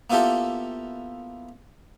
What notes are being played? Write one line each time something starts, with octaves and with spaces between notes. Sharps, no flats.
A#3 B3 E4 F4 G4 A4